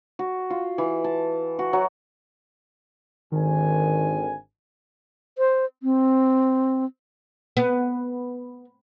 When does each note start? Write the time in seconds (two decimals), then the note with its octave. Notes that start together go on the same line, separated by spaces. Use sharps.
0.19 F#4
0.50 F4
0.78 E3
1.04 A5
1.59 F#4
1.73 F#3
3.32 G#1 D3 D#3 G#5
5.38 C5
5.83 C4
7.57 B3